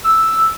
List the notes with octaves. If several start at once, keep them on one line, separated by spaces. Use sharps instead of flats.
E6